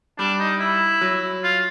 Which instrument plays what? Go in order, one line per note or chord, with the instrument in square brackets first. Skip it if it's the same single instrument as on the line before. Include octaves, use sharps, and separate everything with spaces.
[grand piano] G3 [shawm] D4
[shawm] D#4
E4
[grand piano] F#3
[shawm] F4